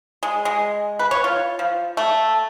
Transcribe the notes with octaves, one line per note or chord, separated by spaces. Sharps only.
G#3
G#3
B4
C#5
F4
F3
A3